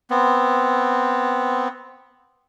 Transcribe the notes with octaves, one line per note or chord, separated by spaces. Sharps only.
B3 C4